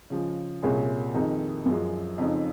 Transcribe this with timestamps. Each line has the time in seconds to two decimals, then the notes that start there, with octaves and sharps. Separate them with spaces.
0.10 C#3 F3 G#3
0.62 C2 A#2 G#3 C#4 G#4
1.14 F2 D#3 G#3 D#4
1.65 F#2 F3 G#3
2.18 F2 C#3 F3 G#3 D#4